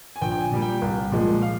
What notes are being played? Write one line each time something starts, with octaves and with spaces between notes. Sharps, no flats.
G#5
A#1 G5
G5
G#5
A#2 G3
G5
C2
A#2 F3 G#3
F5